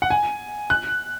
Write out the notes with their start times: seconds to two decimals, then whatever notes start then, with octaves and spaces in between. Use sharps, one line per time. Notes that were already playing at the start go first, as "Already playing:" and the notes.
0.02 F#5
0.10 G#5
0.70 F#6